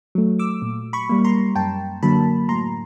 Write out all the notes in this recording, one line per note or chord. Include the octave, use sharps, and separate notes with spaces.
F#3 A3
D6 E6
A#2
B5 C#6
G3 A#3
A#5 C6
F#2 G5 A5
D3 F#3 A#3 A5 B5
A2 A#5 C6